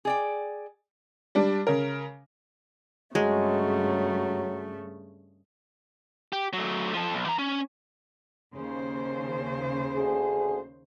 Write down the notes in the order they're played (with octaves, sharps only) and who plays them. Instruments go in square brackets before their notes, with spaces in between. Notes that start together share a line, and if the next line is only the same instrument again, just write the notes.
[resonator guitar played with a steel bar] G#4 D5 G5
[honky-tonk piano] G3 D4
C#3 A#4
[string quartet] G2 C#3 A3 [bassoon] F#3 [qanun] G#3
[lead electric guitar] G4
F#3 A3
F3 A4
B1
E3 A#5
C#4
[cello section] D#2 C#3 C5
[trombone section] D2 G#4